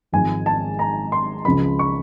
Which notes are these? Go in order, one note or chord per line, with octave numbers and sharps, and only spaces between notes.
G#1 G#2 F3 G#5
A5
A#5
C6
C#2 C#3 F3 B5
C#6